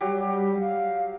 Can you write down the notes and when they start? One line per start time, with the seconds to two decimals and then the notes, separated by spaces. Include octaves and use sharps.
0.01 F#3 G3 G4
0.60 F5